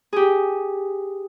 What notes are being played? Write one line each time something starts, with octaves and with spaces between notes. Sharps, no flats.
G4 G#4